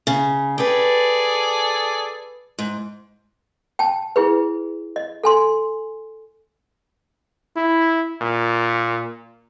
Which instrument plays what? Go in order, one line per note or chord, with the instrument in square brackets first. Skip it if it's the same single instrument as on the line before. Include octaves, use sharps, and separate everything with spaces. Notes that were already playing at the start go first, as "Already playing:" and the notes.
[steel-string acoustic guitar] C#3
[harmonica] G#4 A4 D5 [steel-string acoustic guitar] B4 G5
[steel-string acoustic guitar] G#2
[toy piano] G5 A5
E4 G#4 B4
D#5
A4 G#5 C6
[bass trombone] E4
A#2